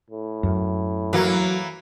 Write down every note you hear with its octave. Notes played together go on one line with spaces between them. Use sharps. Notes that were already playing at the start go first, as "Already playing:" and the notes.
A2
F#2
E3 F#3 A#3